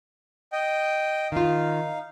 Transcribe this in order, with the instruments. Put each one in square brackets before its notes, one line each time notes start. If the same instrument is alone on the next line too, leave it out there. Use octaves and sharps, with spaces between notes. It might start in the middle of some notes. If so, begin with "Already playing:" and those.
[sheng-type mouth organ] D#5 G5
[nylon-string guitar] D#3 F4 [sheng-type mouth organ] D#4 F5